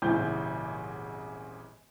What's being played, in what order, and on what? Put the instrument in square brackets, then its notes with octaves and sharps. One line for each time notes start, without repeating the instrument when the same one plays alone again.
[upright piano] D#1 G#1 G#2 C#3 E3 G6